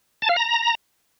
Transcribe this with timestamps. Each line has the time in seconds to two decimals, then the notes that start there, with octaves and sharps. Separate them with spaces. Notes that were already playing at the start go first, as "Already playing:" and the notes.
0.22 A5
0.29 F5
0.36 A#5